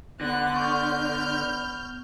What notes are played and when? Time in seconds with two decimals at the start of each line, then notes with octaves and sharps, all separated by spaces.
0.21 D3 B3 F#6
0.56 C#6 F6 G6